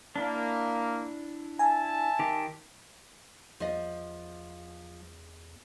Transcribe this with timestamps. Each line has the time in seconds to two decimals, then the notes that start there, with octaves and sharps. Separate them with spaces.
0.16 A#3 D4 E4
1.59 E5 G#5 A5
2.19 D#3 G4
3.60 E2 F3 D#5